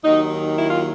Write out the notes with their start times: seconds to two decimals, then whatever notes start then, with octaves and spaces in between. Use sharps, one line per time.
0.04 D#2 D#3 F#3 D#4
0.56 E4
0.70 F4